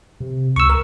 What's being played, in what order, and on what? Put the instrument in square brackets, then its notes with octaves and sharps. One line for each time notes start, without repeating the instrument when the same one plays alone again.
[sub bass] C3
[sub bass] C#2 [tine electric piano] C#6 E6
[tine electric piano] A#4